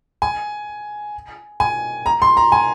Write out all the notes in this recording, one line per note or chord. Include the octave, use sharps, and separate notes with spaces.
G#5
G#5
A#5
C6
A#5
G#5